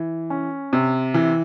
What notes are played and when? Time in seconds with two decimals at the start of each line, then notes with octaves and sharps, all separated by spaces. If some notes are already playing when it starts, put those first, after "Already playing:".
Already playing: E3
0.30 C#4
0.73 C3
1.14 E3